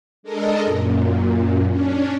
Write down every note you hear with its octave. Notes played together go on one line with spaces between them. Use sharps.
G#3 D4 A4 A#4 D#5
F#2 A#2
C#4 D4